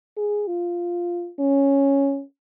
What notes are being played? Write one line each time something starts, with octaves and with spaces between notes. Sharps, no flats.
G#4
F4
C#4